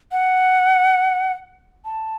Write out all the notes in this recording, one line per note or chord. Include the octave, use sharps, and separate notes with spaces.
F#5
A5